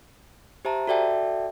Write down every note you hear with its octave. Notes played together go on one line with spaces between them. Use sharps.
G4 C5 E5 A5 A#5
F#4 A4 D5 E5 G5 A5